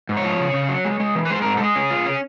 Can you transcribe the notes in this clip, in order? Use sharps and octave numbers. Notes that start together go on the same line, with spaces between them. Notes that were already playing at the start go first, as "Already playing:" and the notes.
G#2
C#5
F3
C#3
C#3
F#3
G#3
G#3
E3
B4
G#3 C5
G#2 A#4
A4
G#3 G#4
C#4
F4
C#4